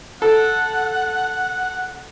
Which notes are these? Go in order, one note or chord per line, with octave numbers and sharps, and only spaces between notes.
A4 F#5